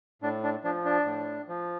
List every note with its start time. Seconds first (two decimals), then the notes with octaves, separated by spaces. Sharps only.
0.22 A2 D4
0.44 D4
0.64 F3 D4
0.85 D4
1.05 A2
1.48 F3